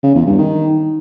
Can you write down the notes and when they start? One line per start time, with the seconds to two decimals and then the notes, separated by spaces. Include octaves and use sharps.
0.03 C#3
0.15 E2
0.26 G2
0.38 D#3